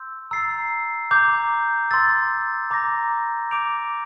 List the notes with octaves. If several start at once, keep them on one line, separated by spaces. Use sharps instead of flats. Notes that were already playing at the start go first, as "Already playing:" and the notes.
Already playing: C6 E6 G6
A#5 E6 A6 C7
A#5 D6 G6
C6 E6 A6
A#5 D6 G6 A#6
D6 G6 D7 F7